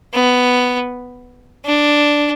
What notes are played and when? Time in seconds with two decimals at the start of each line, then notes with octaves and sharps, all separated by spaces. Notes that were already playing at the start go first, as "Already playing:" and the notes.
0.13 B3
1.65 D4